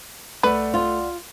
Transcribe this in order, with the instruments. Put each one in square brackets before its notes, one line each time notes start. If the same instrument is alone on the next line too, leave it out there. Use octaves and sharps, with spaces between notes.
[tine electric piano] C2 D5 F#5 [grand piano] A3 [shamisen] B4
[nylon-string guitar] F4